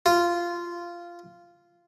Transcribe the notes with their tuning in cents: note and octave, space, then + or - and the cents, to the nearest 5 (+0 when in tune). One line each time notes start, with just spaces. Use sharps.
F4 -10